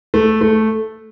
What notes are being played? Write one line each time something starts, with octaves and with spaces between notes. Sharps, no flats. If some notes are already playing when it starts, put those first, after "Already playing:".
A3
A3